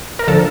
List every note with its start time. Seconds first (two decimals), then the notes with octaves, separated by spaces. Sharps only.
0.19 A#4
0.28 D3 F3 A4